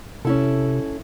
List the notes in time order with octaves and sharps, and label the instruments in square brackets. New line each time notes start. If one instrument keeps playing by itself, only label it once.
[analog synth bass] C3 [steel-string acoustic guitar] C#4 E4 A4